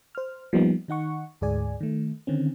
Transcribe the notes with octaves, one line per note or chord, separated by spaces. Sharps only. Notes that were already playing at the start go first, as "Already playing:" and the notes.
C5 F6
F3 G3 A#3 B3 D#4
D#3 D#4 F#5 C#6
D2 G#2 G#4 D5 G#5
D#3 A3
D3 D#3 C4 C#4